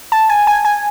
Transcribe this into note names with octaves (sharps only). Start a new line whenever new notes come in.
A5
G#5
G#5
G#5